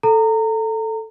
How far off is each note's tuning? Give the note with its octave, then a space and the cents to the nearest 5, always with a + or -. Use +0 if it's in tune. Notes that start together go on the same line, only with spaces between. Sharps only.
A4 +0 A#5 -25